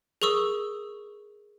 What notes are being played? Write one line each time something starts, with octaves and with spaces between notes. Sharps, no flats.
G#4 A#4 C#6 D#6 E6